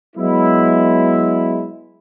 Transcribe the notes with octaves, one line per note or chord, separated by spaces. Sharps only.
F#3 G#3 B3 E4